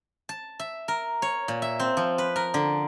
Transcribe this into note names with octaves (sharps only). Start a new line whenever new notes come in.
A5
E5
A#4
C#5
A#2
E5
C4
F3
B4
A#4
D3